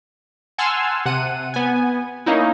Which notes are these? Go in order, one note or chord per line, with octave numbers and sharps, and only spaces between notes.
F#5 G#5 A5 C6 E6 F6
C3 F#5 D#7
B3 G#5
A#3 C#4 D#4 E4